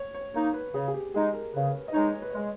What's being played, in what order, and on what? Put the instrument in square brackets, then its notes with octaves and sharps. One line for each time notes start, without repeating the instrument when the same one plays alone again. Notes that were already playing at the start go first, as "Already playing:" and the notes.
Already playing: [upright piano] C#5
C#5
[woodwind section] A#3 D#4 [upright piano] C#5
[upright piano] B4
[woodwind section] C#3 [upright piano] G#4
[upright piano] G#4
G4
[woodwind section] G#3 D#4 [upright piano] G#4
[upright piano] A#4
[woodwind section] C#3 [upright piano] B4
[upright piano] C#5
B4
D#5
[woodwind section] G#3 D#4 [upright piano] C#5
[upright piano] C#5
B4
[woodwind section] G#3 [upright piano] C#5